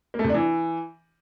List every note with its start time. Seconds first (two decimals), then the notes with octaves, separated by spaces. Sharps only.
0.14 A#3
0.19 A3
0.24 C3
0.29 D4
0.34 E3